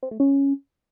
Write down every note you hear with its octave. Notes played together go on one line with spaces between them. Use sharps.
C4
A3
C#4